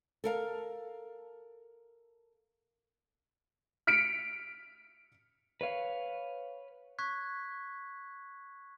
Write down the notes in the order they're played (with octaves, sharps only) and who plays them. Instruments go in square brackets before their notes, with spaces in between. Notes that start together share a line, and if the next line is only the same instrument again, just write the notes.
[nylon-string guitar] A4 A#4 F5
[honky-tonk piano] F6 B6 C#7 D7
[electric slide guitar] B4 C#5 F5
[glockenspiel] C#6 F#6 G#6 B6